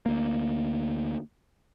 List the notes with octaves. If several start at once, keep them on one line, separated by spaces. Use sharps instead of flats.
D2 A#3